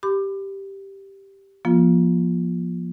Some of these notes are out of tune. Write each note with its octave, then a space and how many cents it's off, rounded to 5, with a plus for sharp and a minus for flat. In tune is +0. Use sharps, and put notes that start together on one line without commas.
G4 +0 B5 +30 D6 +25
F3 +0 A#3 +45 F4 +0